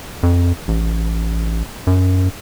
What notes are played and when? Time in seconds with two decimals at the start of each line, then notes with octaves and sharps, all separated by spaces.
0.23 F2
0.68 A1
1.87 F#2